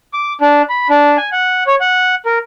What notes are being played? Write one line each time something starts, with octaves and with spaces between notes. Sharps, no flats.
D6
D4
B5
D4
G#5
F#5
C#5
F#5
A#4